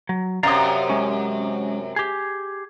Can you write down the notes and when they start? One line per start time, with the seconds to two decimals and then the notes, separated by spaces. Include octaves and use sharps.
0.09 F#3
0.43 F#2 C3 D5 D#5 F5 A#5
0.90 G#3 C#4
1.96 G4 G#4